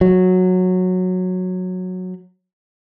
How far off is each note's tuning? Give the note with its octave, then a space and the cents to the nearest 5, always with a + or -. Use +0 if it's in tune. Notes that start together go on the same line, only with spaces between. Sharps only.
F#3 -10